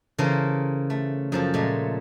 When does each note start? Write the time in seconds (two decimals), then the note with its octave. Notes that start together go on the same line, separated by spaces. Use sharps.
0.18 C#3 E3 A4 A#4 C5
0.90 A3
1.32 F#2 F3 A4
1.54 A#2 G#3 A3